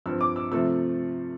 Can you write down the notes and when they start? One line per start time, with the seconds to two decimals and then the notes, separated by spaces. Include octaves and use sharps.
0.06 G2 F3 C4 E6
0.21 D6
0.36 E6
0.52 C3 F3 A3 C4 E6